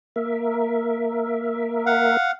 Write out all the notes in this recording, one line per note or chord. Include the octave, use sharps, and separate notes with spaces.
A#3 A#4 E5
F5 F#5